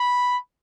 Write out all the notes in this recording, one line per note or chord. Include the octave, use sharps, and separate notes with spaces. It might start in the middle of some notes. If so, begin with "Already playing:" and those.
Already playing: B5